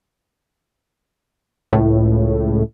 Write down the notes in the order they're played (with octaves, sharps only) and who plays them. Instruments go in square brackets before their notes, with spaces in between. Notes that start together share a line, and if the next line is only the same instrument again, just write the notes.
[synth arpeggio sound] C#2 A2